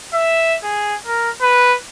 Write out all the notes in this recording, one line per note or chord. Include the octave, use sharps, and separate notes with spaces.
E5
G#4
A#4
B4